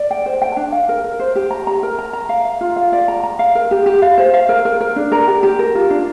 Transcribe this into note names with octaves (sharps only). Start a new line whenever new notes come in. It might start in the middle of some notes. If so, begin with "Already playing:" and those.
Already playing: D5
G5
C5
G5
D4
F5
A#4
A#4
C5
G4
A#5
A#5
A#4
A#5
A#5
F5
F5
F4
F5
D5
A#5
A#5
F5
A#4
G4
G4
F5
C5
F5
A#4
A#4
A#4
D4
A#4
G4
G4
A#4
F4
D4